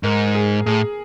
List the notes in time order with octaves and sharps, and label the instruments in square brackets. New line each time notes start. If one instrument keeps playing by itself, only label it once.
[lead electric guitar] G#2 [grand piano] A#4
[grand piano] G#4
[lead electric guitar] A2 [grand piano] G#4